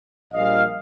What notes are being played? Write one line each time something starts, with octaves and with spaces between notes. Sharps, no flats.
A#1 A#2 G3 D#5 F5